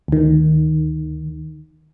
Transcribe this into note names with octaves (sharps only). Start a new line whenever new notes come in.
D2 D#3